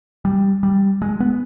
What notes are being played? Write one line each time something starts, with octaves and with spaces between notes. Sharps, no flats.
G3
G3
G#3
B3